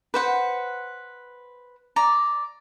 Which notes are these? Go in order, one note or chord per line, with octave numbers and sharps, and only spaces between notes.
B4 C5 F#5
D5 A#5